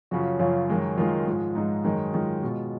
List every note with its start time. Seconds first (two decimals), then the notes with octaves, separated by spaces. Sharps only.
0.11 F#2 C#3 F3 F#4
0.39 F#2 C#3 F3 F4
0.69 F#2 D#3 G#3
0.97 F#2 D#3 G#3 F4
1.26 G#2 F3 G#3
1.55 G#2 F3 G#3 D#4
1.84 F#2 D#3 G#3 D#4
2.13 F#2 D#3 G#3 F4
2.43 B2 G#3 F4